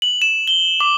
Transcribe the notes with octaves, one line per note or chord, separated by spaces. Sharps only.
F#7
E7
G7
D6